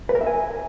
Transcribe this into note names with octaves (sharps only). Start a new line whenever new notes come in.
B4
A#4
E5
G#5